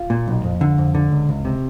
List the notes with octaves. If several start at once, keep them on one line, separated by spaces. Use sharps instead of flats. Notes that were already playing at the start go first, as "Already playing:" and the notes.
Already playing: F4
A#2
B1
F2
D3
F2
D3
C#2
C#2
C3